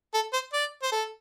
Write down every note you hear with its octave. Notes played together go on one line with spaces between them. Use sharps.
A4
C5
D5
C5
A4